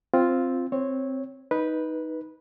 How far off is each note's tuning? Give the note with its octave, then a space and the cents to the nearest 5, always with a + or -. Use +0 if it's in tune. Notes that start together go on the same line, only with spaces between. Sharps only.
C4 +0 F4 +0
C4 +0 C#5 -10
D#4 +10 B4 -10